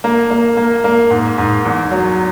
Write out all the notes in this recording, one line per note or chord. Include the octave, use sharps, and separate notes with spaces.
A#3
A#3
A#3
A#3
G#2
G#2
E2
F#3